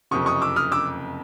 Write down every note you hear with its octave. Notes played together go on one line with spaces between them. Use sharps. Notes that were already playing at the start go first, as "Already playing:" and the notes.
F#1 F2 C3 C#6 D#6
C#6 D#6
D6 E6
D#6 F6
D6 E6